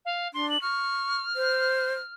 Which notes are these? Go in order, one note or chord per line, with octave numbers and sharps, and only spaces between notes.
F5
D4 C6
F#7
C#6 F6
C5